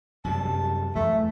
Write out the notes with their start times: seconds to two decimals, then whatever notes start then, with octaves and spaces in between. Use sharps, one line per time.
0.25 F#2 C3 G3 A5
0.95 E2 A3